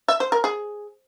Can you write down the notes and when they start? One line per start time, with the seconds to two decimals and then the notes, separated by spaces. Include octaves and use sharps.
0.08 E5
0.20 C5
0.32 A#4
0.44 G#4